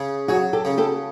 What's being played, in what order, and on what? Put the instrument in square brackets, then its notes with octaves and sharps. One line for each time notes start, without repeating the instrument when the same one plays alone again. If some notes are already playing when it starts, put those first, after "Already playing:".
Already playing: [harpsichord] C#3
[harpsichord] F#3 [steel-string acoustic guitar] F#4 G#4
[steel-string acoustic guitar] G4 A4
[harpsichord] C#3
[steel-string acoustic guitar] G4 A4